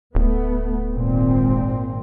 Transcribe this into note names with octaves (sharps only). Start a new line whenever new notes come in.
D1 A3 B3
G#1 A#2 C4